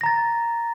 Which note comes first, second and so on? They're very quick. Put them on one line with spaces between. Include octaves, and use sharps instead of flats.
A#6 A#5 A6